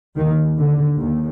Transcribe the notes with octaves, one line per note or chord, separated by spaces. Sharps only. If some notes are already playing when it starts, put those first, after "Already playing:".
D#2 D#3
D3
D#2